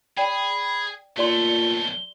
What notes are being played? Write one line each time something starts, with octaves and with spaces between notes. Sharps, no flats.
G#4 D5 G5 B5
B1 A#2 A3 G4 D5 C6 G7